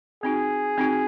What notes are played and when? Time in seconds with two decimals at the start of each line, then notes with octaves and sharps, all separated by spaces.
0.23 C4 D#4 F#4 G#4
0.78 C4 D#4 F#4